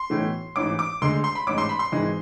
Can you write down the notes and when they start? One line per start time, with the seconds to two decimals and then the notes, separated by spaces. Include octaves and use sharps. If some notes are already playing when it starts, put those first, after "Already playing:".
Already playing: C6
0.10 B1 A2 E3 A3
0.56 A1 G#2 E3 D6
0.79 D6
1.01 D2 D3 G#3 C6
1.24 C6
1.35 B5
1.47 A1 G#2 G#3 D6
1.58 C6
1.69 B5
1.79 C6
1.92 G#1 G#2 E3 G#3